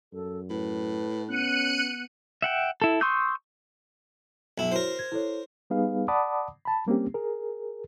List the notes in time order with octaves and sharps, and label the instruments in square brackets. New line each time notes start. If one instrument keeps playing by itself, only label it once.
[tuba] F#2 [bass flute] A4
[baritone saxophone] A2 [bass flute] B4
[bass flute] B3 [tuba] C#4 [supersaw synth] F#6 C#7 D#7
[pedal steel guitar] E5 F#5 G5
E4 A4
C6 C#6 D#6 E6 G6
[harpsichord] B1 E4
[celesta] E4 F#4 C#5 [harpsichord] A#4 C5
[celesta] G#6
E4 A4 C#5
[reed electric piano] G3 B3 D#4 G#4 B4 F5
D5 F#5 A5 B5 D6 D#6
A5 B5
G3 A#3 C4 C#4 G4
G#4 A#4